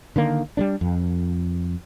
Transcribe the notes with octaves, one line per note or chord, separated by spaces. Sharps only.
D3 D#3 A#3
G3 G#3 D4
F2